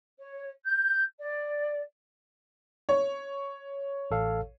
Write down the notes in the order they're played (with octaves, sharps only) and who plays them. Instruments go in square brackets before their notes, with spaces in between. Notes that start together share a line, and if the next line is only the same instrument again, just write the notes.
[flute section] C#5
G6
D5
[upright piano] C#5
[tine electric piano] A1 A4 F5